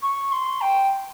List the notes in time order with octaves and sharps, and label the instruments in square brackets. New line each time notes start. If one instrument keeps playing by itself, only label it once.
[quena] C#6
C6
G5